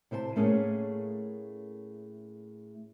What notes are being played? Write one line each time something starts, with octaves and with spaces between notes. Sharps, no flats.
C3 E4 C5 F5 A5
A2 A3 A#3 C#4 G#4 A4